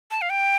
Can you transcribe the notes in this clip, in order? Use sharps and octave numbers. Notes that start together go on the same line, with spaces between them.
A5
F5
G5